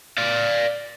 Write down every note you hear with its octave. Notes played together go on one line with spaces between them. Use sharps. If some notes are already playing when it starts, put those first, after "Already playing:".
D5 F5